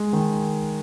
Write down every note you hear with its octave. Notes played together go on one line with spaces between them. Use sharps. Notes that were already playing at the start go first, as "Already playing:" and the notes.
Already playing: G#3
D#3